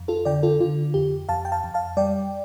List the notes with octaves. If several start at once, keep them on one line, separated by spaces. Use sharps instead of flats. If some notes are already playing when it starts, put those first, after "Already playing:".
Already playing: F2
F4 A4
D3 D5 G5
F4 A4
D3 F4
F2 G4
F2 F5 A5
G5
F5 A5
F2
F5 A5
G3 D5 G5